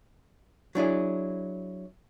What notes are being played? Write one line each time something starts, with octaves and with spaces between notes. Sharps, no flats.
F#3 D4 E4 G#4